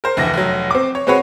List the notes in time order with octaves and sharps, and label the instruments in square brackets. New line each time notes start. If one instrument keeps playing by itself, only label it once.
[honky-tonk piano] A#4 C5
F1 D2 E3 A#6
F1 F#3
C4 D6
C#5
G#3 C4 F#4 B4 C#5